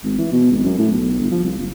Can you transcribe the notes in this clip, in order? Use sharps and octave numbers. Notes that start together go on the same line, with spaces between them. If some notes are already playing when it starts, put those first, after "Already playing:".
G#1
E3
B2
G#1
F#2
A2
B1
G1
F3
C2
F#1